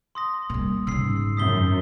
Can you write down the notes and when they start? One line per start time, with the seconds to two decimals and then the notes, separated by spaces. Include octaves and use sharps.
0.15 C6 D#6 A#6
0.50 A#2 G3
0.87 G#2 C#3 E6 C7
1.37 F#2 D#6 B6 G7